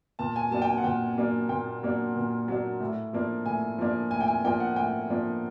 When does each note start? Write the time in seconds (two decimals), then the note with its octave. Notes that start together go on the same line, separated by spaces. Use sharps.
0.19 A#2 A5
0.36 G#5
0.51 F#3 A#3 D4 A5
0.62 G5
0.67 G#5
0.78 F#5
0.84 A#2 G5
1.18 F#3 A#3 D4
1.49 A#2 G5
1.83 F#3 A#3 D4
2.16 A#2
2.48 F#3 A#3 D4
2.80 A2
3.13 F3 A#3 D4
3.46 A2 G#5
3.78 F3 A#3 D4
4.11 A2 G#5
4.20 G5
4.28 G#5
4.44 F3 A#3 D4 G5
4.60 F#5
4.76 A2 G5
5.10 F3 A#3 D4